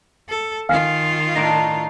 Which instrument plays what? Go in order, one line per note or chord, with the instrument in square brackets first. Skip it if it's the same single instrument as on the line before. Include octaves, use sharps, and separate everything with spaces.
[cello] A4
[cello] D#3 F4 [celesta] F5 G#5 F6
[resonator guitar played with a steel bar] A2 D4 D#4 [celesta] A#6 D7